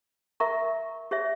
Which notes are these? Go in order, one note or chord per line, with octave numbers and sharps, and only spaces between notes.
A#4 E5 A#5 C#6
G4 C#5 E5